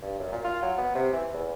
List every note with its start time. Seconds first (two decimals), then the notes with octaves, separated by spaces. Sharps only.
0.02 G2
0.19 F#2
0.32 A#2
0.44 F4
0.62 F#3
0.78 B3
0.95 C3
1.13 E3
1.34 E2